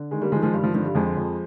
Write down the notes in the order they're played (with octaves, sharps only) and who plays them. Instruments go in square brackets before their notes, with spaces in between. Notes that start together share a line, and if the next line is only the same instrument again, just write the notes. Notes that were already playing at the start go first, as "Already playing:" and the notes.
Already playing: [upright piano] D3
D#3 G#3
G3 A#3
D#3 F3 G#3
F3 G#3
G2 G3
F3
D3 F3
G3
F2 F3 G#3
F2